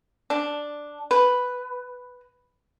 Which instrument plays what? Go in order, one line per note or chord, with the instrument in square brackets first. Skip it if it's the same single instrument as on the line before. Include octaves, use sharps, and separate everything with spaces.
[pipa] D4
B4